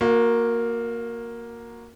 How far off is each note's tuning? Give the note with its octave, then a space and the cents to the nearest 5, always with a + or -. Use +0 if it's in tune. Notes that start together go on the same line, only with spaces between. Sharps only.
A#3 +0 F#4 -30